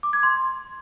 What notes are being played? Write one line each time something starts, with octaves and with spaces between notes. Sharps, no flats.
D6
G#6
C6